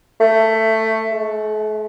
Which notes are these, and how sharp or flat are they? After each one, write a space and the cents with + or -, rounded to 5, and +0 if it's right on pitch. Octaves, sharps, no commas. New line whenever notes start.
A3 +15
A3 -45